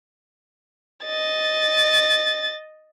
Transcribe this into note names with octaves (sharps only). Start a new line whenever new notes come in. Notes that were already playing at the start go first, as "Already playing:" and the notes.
D#5 A6